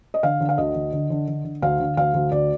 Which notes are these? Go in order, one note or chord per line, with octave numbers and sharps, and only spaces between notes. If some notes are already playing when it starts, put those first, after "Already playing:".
D#5
D3 F5
D3
F5
D2 D#5
D3
D3
D3
D3
D3
D2 F5
D3
D2 F5
D2
D2 D5